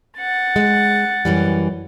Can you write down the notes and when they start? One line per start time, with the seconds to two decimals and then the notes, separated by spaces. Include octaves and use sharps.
0.18 F#5 A6
0.56 G#3
1.25 F#2 E3 G3